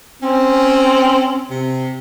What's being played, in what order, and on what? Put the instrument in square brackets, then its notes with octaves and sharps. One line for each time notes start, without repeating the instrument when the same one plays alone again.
[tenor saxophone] C4 [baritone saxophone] C#4
[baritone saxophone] C3